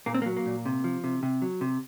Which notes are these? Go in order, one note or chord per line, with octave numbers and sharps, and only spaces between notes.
A#2 A#3
C4
A#3
F#3
A#3
A#2
C3
F3
C3
C3
F#3
C3